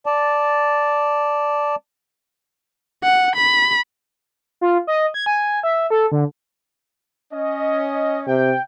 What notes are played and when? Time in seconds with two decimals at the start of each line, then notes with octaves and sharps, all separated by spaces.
0.06 D5 A5
3.03 F#5
3.36 B5
4.61 F4
4.87 D#5
5.14 G#6
5.26 G#5
5.63 E5
5.90 A4
6.12 D3
7.33 C#4 D#5
8.27 C3 G5